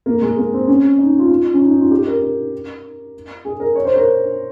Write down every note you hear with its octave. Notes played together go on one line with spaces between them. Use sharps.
A#3
G#3
A#3
C4
C#4
D#4
F4
F4
C#4
D#4
D#4
F4
G4
A#4
A#4
G#4
A#4
C#5
C5
A#4